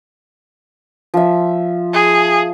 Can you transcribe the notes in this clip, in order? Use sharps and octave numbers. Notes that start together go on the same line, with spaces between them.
F3 E5
G#4